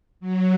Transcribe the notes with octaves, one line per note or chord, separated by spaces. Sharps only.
F#3